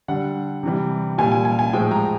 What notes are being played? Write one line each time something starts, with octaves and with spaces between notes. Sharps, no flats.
D3 G3 F#5
C3 E3 G3
A#2 G3 G#5
G#5
G#5
G#5
A2 F3 G#3 G5
A#5